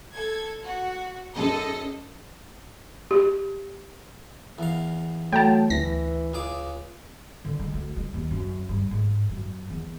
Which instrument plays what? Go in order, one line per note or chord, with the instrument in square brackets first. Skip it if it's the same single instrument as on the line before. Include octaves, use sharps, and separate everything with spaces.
[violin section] A4 G#6
F#4
[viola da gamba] F#2 D#4 G#4 [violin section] A4 D#5
[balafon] G4
[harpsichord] E2 F5
[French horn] F#3 [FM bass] A3 [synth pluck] G5 A5
[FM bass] D2 [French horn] E3 [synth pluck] A#6
[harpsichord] C#2 G#4 D6
[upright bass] D3
G#3
D2
G#3
D#2
F#2
G2
G#2
F#2
E2